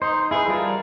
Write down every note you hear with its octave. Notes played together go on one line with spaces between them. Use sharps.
D#4 C5
E4 G#4 B4
G3 F4 A#4 A5